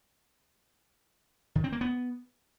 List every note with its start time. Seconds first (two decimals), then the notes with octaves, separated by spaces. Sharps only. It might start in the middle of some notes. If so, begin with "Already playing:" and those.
1.55 D#3
1.64 C4
1.72 A#3
1.81 B3